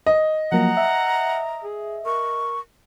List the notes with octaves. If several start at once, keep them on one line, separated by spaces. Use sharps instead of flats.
D#5
F3 F#3 A#3 F#5 A#5
E5
G#4
A#4 C#6